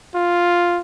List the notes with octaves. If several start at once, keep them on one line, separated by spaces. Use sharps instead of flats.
F4